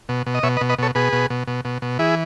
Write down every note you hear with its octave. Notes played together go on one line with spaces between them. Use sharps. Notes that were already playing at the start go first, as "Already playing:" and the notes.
B2
B2
D#5
B2 C#5 E5
B4 D#5
B2
B4 D#5
B2 A4 C#5
B2 G#4 B4
B2
B2
B2
B2
B2
E3 E4 G#4